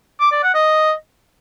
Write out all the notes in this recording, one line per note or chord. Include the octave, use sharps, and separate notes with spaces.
D6
D5
F#5
D#5